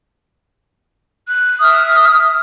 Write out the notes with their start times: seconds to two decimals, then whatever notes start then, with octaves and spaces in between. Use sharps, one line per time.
1.27 F#6
1.61 E5 D#6 F6